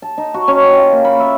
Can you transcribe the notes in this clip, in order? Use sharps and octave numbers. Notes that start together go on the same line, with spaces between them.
A5
D#4
F#4
C#4
G5
F4
A#3
B5
E5